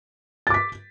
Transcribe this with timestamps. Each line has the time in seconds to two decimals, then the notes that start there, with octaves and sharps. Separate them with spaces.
0.47 A6
0.50 D6
0.54 B6